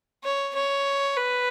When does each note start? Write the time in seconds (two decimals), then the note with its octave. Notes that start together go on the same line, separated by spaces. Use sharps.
0.24 C#5
0.55 C#5
1.17 B4